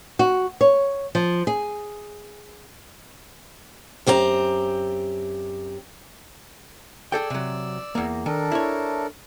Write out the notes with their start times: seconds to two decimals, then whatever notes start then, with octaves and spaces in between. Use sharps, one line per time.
0.19 F#4
0.61 C#5
1.15 F3
1.47 G#4
4.07 F#2 C4 G4 A#5
7.12 G#4 A4 D5 G5 E6
7.30 C3 F#3
7.95 E2 A#3
8.26 D#3 D4 A4 A#4
8.52 E4 C#5